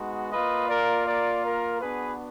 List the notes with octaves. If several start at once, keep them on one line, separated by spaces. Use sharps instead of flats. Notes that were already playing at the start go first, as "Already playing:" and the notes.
Already playing: G#3 B3 D#4 F#4
A#3 F4 B4 D#5
A#4 D5
A#4 D5
A#4
B3 D4 F#4 G#4 B4